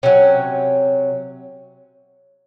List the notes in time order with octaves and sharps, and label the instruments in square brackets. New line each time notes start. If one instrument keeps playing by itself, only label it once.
[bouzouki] C3 F#3 C#4